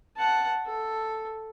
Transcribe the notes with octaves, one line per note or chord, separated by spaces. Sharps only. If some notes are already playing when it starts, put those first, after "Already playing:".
F#5 A5
A4